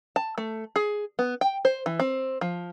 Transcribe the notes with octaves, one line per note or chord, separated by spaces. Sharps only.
A5
A3
G#4
B3
G5
C5
E3
C4
F3